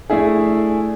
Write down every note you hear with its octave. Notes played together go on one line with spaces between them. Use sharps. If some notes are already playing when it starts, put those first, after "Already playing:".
A3 D4 E4 G#4